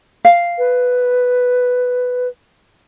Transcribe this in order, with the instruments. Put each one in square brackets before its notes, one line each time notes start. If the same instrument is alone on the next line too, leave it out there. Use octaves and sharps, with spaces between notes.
[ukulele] F5
[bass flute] B4